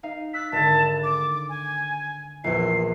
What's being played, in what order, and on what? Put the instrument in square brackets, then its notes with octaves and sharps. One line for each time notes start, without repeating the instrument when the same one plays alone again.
[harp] D#4 F5
[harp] E6 F#6 A6 [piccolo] B6
[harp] G#1 D3 A4 [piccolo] A5
[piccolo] D6 [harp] A6
[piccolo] G#5
[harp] A#1 E2 [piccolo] C7